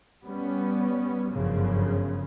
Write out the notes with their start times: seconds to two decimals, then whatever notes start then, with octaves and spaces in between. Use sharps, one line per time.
0.24 G3 B3 C#4
1.32 G1 F#2 C#3 F3